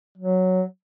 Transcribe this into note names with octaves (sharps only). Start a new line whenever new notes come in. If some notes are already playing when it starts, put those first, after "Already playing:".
F#3